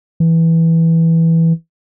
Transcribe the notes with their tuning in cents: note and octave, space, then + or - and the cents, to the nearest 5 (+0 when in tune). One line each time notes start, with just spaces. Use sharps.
E3 -5